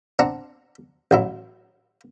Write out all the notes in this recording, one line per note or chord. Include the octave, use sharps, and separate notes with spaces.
C4 D4 F#5 A#5
A1 F#3 E4